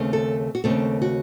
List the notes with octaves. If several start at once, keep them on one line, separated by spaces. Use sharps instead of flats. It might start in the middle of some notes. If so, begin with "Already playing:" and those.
Already playing: D#2 C#3 A3 C4
A4
F#4
D#2 C#3 A3 C4 A4
F#4